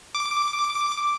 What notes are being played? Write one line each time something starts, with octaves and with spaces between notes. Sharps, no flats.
D6